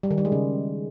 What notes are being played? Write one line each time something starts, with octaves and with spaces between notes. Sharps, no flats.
G3
D#3
G3
G#3
C#3